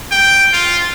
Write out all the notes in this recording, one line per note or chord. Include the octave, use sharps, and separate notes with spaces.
G5
F4